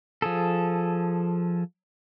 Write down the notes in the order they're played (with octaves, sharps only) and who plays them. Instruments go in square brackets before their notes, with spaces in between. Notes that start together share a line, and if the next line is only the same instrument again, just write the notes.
[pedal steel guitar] F3 G#4 A4